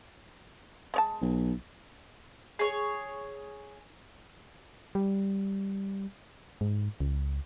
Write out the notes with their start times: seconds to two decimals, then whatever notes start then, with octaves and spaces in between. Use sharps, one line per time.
0.94 G#3 C#5 A5
1.22 B1
2.59 G#4 C#5
4.95 G3
6.61 G#2
7.00 C#2